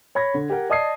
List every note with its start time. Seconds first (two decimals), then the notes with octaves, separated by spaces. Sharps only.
0.15 C#5 B5 G#6 A#6
0.34 D3
0.50 G4 A#4 F#5 G5
0.70 D5 D#5 A5 D#6 G#6 C7